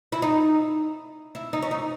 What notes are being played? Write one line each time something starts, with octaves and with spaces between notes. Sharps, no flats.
E4
D#4
E4
D#4
C#4
D#4